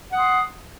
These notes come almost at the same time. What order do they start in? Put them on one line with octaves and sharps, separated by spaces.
F#5 D#6 C6